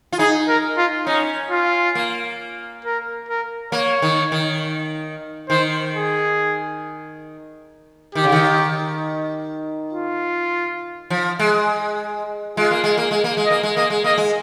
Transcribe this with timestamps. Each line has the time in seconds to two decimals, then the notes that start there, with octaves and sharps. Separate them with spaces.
0.12 F4
0.19 D#4 G#4
0.49 A#4
0.77 F4
1.07 C#4 D#4
1.51 F4
1.95 A#3
2.85 A#4
3.29 A#4
3.72 A#3 C#5
4.02 D#3
4.32 D#3
5.49 D#3 C5
5.94 G#4
8.15 D#3 G4
8.24 C#3
8.32 D#3
9.93 F4
11.10 F3
11.39 G#3
12.57 G#3 F4
12.71 A#3
12.84 G#3
12.97 A#3
13.11 G#3
13.24 A#3
13.37 G#3
13.46 D#5
13.51 A#3
13.63 G#3
13.76 A#3 D#5
13.90 G#3
14.04 A#3 D#5
14.18 G#3